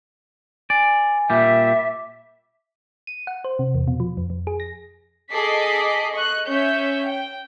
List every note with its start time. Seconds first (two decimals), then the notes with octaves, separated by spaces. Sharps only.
0.70 D5 G#5
1.30 A#2 G3 E5 D6
3.07 D#7
3.27 F#5
3.44 C5
3.59 C3
3.75 E2
3.88 B2
4.00 F3
4.17 F2
4.30 F2
4.47 G#4
4.60 A#6
5.31 G#4 A4 D#5 D6 B6 C7
6.12 D#5 C#6 F#6
6.47 C#4 C#5 E5 G6
7.07 G5